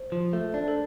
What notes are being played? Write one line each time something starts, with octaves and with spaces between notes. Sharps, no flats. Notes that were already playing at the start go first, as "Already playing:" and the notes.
Already playing: C5
F3
A3
D4
A4